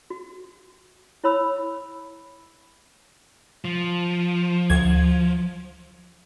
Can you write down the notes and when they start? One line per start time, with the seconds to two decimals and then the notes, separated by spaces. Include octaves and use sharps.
0.10 F#4
1.24 E4 C#5 B5 E6
3.65 F3
4.70 D2 G#6